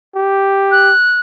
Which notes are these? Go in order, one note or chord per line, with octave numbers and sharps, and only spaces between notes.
G4
F#6